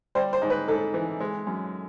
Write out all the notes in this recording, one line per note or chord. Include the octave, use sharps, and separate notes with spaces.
G3 C5
C5
G#2
B4
G#2 A4
E3
G#3
F#2